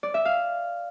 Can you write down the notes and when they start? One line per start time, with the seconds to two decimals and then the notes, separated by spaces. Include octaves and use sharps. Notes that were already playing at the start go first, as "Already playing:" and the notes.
0.03 D5
0.14 E5
0.25 F5